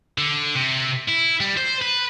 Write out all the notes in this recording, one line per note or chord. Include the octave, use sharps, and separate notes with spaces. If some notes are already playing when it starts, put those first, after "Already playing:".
D3
C3
E4
G3
C5
B4